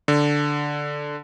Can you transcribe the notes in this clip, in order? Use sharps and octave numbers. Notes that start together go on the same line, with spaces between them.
D3